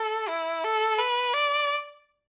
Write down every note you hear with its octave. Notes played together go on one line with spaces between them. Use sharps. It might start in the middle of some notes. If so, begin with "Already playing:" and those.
Already playing: A4
E4
A4
B4
D5